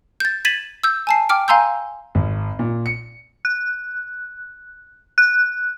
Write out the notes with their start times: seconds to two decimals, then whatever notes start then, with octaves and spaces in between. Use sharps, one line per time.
0.20 G6 A6
0.45 G#6 A6 B6 D#7 E7 F#7
0.84 E6 G6
1.07 G#5 A5 C7
1.29 G5 D6 F6 D7
1.48 F5 G#5 A#5 C6 E6 G6
2.15 G#1
2.59 A#2
2.86 C#7
3.45 F#6
5.18 F#6